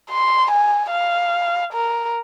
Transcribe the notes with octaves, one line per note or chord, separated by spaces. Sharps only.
C6
G#5
F5
A#4